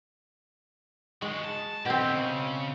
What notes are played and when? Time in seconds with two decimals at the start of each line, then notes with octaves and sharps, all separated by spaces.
1.22 G#3 F#4 G#4
1.44 A5
1.85 B2 C4 E4 G4
2.12 C#3